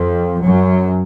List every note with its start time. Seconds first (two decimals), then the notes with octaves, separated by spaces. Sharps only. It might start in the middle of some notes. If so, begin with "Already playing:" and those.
Already playing: F2 F3
0.41 F#2 F#3